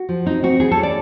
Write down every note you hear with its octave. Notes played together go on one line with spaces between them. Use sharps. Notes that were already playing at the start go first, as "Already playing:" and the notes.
Already playing: F#4
F3
C4 D#4
C4 F#4
E3 G#4
A4
C#4
D5